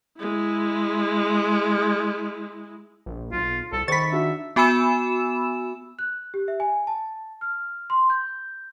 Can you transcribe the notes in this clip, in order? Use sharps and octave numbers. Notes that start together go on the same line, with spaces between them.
G#3 E4
A#1
B1 F4
C2 A4
D#3 C5 B5 C#6 A6 B6
D4 F#4 E5
B3 F#4 G#5 B5 E6 E7
F#6
G4
E5
G#5
A5
F6
C6
G6